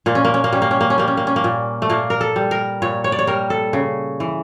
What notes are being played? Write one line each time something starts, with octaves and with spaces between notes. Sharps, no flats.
A#2 A#3
C#4
A#3
C#4
A#3
G3 C#4
A#3
C#4
A#3
C#4
G3 A#3
C#4
A#3
C#4
A#3
A#2
A3
A#2 A#3
A#4
A4
G3
A#4
A#2 C#5
C#5
D5
C#5
G3 A#4
A4
C#3
E3